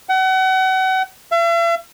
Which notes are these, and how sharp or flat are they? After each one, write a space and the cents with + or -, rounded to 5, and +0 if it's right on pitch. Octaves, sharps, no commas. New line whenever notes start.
F#5 +35
E5 +45